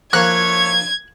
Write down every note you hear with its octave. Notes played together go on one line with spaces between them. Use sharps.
F3 A3 A#3 C#5 F#6 G#6